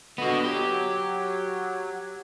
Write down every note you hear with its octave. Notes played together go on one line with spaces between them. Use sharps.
D3 B3 F#4 D#5
F#3 G4